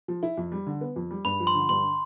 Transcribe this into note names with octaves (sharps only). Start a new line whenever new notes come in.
F3
E4
F2
G3
D3
B3
F2
G3
G2 B5
F3
C6
D3
G2 C6